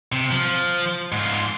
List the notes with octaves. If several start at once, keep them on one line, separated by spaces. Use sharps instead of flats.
C3
F3
G#2 F4